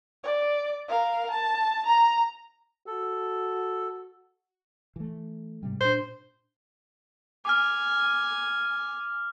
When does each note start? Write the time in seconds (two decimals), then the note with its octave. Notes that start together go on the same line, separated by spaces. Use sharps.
0.24 D5
0.88 A#4 F5
1.31 A5
1.86 A#5
2.87 F#4 A4
4.96 E3 A3
5.63 G#2 C3 G3
5.81 A#2 D4 C5
7.45 G#5 D6 F6